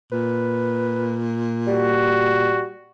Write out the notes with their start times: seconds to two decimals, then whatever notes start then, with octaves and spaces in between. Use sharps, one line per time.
0.12 A#2 B4
1.67 G3 F#4